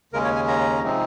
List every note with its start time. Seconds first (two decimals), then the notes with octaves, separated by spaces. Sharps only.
0.13 D#2 C#3 G#3 C#4 A#4
0.24 C#5
0.36 G#5
0.48 A#5
0.82 C3 F3 G#3 C4 D#4